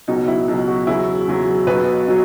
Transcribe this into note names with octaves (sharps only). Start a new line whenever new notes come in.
C#2 B2 F#3 D#4
E4
C#2 B2 F#3
F#4
E2 C#3 F#3 E4
E2 C#3 F#3
B1 B2 F#3 B4
B2 F#3